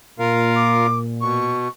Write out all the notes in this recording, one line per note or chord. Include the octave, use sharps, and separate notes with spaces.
A#2 F4 A#4 F5
D6
B2 C#6